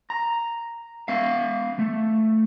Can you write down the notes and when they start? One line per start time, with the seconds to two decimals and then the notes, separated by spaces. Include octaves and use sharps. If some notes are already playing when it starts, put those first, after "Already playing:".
0.10 A#5
1.08 B3 E5 F5
1.79 A3